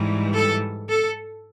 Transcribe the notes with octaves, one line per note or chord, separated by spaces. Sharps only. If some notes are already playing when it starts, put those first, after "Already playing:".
Already playing: G#2 E3 G3
A4
A4